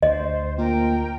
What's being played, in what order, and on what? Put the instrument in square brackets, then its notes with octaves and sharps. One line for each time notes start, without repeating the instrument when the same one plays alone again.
[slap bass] D2 [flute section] C5 [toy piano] D#5
[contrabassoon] A#2 [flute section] A#4 G5